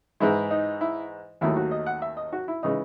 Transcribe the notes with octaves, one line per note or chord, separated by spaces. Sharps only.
G#2 E3 G#3 E4
D#4
E4
D#2 D#3 F#3 A3 E4
F#4
D#5
F#5
E5
D#5
F#4
E4
C#3 E3 G#3 D#4